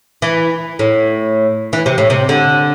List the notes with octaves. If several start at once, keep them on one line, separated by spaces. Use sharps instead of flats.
E3
A2
E3
C3
A2
C3
D3